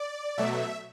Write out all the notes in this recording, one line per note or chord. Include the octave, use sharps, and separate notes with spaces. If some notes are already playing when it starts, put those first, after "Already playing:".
Already playing: D5
B2 F#3 A3 E5